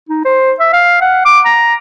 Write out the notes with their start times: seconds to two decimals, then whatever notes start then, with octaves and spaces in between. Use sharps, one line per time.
0.09 D#4
0.25 C5
0.59 E5
0.73 F5
1.01 F#5
1.25 D6
1.45 A#5